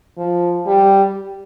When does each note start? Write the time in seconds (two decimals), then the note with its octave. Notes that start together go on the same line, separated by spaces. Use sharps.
0.18 F3
0.67 G3